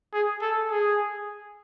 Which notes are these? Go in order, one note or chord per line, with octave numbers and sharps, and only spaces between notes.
G#4
A4
G#4